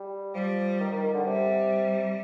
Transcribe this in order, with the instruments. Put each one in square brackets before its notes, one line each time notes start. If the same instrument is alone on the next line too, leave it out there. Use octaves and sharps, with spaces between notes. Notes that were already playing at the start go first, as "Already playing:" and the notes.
Already playing: [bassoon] G3
[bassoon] F3 [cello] G3
[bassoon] D#3
D#3
D#3
D3
[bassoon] C3 [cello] G3